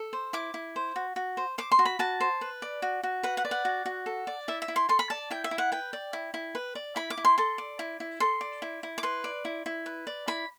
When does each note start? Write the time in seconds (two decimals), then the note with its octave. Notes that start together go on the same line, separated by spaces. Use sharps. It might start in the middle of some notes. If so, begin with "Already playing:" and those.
Already playing: A4
0.13 C5
0.33 E4 D6
0.54 E4
0.76 C5
0.96 F#4
1.16 F#4
1.37 C5
1.58 C5 D6
1.72 C6
1.79 F#4
1.85 B5
1.99 F#4 A5
2.20 C5
2.41 B4
2.62 D5
2.82 F#4
3.03 F#4
3.23 B4 F#5
3.37 F#5
3.45 D5
3.51 F#5
3.65 F#4
3.86 F#4
4.06 A4
4.27 D5
4.48 E4 E5
4.62 E5
4.68 E4
4.76 C6
4.89 A4 C6
4.99 B5
5.10 D5 A5
5.31 E4 G5
5.44 E5
5.51 E4
5.58 F#5
5.72 B4 G5
5.93 D5
6.13 E4
6.34 E4
6.55 B4
6.75 D5
6.96 E4 B5
7.10 D6
7.17 E4
7.25 C6
7.38 A4 C6
7.58 D5
7.79 E4
8.00 E4
8.20 A4 C6
8.41 D5
8.62 E4
8.83 E4
8.98 D6
9.03 B4 C6
9.24 D5
9.45 E4
9.66 E4
9.86 B4
10.07 D5
10.28 E4 B5